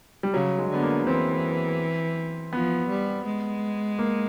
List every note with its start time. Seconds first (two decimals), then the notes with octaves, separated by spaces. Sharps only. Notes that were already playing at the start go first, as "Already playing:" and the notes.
0.23 G3
0.33 C#3 F#3
0.59 G#3
0.70 D3 B3
0.83 A#3
1.07 E3 C4
2.53 F3 B3
2.89 G3
3.26 G#3
3.99 A#3